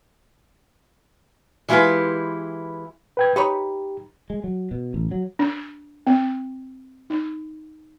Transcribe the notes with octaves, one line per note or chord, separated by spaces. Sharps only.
E3 G#3 E4 F4 G4 B4
B4 G5 G#6
D#4 G4 B4 C#5
G#3
F#3
B2
A1
F#3
D4
C4
D#4